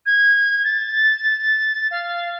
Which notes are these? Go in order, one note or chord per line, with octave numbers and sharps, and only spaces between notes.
G#6
A6
F5